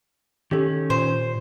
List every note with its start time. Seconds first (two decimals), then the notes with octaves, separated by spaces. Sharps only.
0.51 D#3 C#4 G4 A4
0.90 A#2 C5